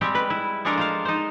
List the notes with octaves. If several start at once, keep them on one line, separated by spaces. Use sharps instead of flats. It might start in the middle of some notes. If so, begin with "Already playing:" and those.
G3 G#3 C4 G4
B4
E4
F3 G#3 D4 A4 A#4
F4 C5 F5
D#4 C5